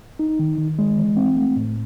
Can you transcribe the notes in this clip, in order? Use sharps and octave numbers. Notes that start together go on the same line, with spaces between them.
D#4
D#3
D#3
G#3
E3
C4
A3
A2